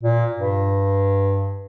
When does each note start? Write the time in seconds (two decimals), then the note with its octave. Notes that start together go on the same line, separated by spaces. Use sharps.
0.03 A#2
0.36 G2